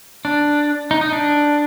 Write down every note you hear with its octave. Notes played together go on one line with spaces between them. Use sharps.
D4
D#4
D#4
D4